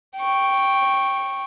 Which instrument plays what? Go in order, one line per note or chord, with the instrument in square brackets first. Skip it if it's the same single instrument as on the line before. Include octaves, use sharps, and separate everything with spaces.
[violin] G5 C#6